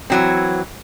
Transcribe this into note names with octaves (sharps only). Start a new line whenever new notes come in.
E3 F#3 C4